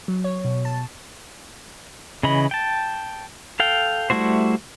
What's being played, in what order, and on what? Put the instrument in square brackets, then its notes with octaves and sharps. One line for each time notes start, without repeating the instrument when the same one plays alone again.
[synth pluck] F#3
C#5
B2
A5
[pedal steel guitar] C#3 E3 D#5 B5
G5 A5
A4 F5 G5
G3 A3 E4 F#4 C5